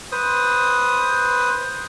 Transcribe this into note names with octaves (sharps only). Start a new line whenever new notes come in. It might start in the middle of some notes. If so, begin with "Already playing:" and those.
B4 C5 D#6